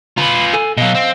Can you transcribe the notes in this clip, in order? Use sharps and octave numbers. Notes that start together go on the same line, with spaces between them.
F4 B4 A#5 B5
A4 G#5
B2 F#3 D#5 F5
C4